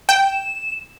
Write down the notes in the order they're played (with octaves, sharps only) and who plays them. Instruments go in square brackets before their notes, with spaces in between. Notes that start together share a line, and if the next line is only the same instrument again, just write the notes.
[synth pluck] G5 [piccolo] E7